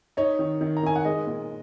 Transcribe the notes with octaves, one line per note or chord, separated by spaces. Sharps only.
D#4 C#5
D#3
D#3
A#5
D#3 G#5
F#5
G#3 D#5
A#2